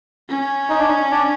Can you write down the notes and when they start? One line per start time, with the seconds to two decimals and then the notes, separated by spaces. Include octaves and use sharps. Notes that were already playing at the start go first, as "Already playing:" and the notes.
0.29 C#4
0.70 D#4
0.80 D4
0.88 D#4
1.11 D4